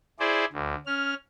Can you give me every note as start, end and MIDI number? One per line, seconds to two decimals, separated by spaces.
0.19 0.45 64
0.19 0.45 68
0.19 0.45 72
0.19 0.45 74
0.53 0.75 38
0.86 1.14 61
0.86 1.14 89